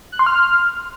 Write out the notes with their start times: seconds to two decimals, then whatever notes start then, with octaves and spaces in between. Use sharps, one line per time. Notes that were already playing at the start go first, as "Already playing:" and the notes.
0.12 F#6
0.19 C6
0.26 F6